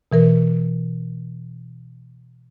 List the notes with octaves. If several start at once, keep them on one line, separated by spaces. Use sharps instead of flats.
B2 E3 A#4